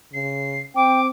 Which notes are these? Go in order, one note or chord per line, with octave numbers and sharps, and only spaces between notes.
C#3 C7
C4 G5 D6